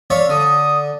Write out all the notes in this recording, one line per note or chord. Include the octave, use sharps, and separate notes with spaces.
C#5 D5 E5 F5
D3 D#6